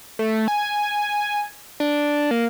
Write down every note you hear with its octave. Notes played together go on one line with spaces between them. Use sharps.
A3
G#5
D4
A#3